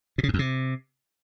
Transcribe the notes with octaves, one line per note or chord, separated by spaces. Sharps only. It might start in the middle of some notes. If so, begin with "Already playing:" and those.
B2
C#3
G#2
F2
C3